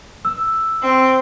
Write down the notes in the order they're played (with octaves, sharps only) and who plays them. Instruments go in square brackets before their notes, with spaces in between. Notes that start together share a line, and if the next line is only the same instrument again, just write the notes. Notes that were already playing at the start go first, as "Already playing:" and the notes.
[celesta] E6
[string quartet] C4